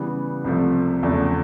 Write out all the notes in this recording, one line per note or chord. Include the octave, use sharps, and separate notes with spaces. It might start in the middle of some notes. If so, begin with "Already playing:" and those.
Already playing: C#3 E3 G3 B3
C2 C3 F3 A3
E2 C#3 F3 A3